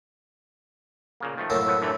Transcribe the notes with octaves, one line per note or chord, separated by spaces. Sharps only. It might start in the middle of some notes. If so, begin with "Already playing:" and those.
A#2 C#3 A#3
D#3 F3 A3
F#2 A2 A#3 E6
F3 B3
D3 E3 A3